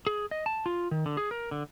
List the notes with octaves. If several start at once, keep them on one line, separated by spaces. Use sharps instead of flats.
G#4
D#5
A5
F4
D#3
D3
G#4
A#4
D3